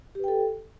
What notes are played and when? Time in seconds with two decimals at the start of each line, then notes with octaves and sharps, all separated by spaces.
0.15 G4
0.19 B4
0.24 G5
0.28 A4